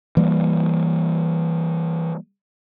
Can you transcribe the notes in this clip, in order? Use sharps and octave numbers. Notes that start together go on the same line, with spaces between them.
E3 G3 A#3